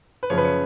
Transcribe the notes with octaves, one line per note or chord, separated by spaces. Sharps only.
B4
F#2 C#3 F3 C#5
B4
C#5